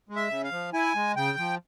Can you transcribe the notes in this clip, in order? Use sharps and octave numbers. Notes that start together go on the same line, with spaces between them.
G#3
E5
C#3
F5
F3
E4 G#5
G#3
C#3 G5
F3